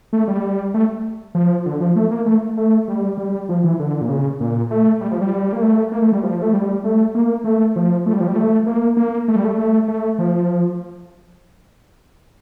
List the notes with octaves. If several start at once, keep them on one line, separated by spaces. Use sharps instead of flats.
A3
G3
A3
F3
D3
F3
A3
A#3
A3
A3
G3
G3
F3
E3
D3
A#2
C#3
A#2
A3
G3
F3
G3
A#3
A3
A#3
A3
G3
F3
A3
G3
A3
A#3
A3
F3
A3
G3
F3
G3
A3
A#3
A#3
A3
G3
A3
A3
A3
F3